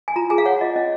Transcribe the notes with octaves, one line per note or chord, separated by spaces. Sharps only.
G#5
F4 A#5
G#4 G#5
F5
C#5 F#5
F4 D#5
C#4 D#5